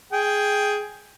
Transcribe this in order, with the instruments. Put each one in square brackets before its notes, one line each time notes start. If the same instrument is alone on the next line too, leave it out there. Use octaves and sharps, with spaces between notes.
[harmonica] G#4 G5